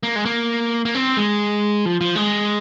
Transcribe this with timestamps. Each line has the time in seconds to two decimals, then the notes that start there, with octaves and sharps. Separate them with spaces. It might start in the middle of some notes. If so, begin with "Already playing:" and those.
0.03 A#3
0.16 G#3
0.25 A#3
0.85 A#3
0.94 C4
1.17 G#3
1.86 F3
2.01 F3
2.16 G#3